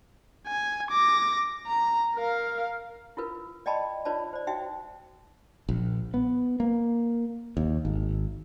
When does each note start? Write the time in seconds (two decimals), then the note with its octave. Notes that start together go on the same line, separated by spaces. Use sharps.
0.47 G#5
0.91 D6 A#6
1.66 A#5
2.15 A#4 F5
3.17 E4 F4 A#4 B4
3.66 D5 D#5 G5 A5 B5 C6
4.05 D#4 F4 B4 C#5 D5 A5
4.33 C5 D5
4.47 D#4 F#4 E5 G5
5.69 A#1
6.14 B3
6.60 A#3
7.57 D#2
7.85 G#1